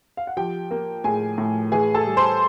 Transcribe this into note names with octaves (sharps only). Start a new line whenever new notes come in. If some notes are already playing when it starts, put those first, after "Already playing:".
F5
F#5
F3 G4 G5
A#3
A2 G#4 G#5
A2
E3 G#4 G#5
A4 A5
G3
C5 C6